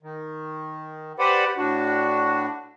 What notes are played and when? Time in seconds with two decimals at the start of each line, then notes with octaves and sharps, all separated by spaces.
0.03 D#3
1.19 G4 B4 C5 D5 F#5 B5
1.57 A2 D4 F#4